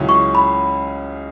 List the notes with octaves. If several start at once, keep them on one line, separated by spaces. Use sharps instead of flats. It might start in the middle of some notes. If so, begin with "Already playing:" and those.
Already playing: C#2 C#3 F#3 C#4 E4
C#6
B5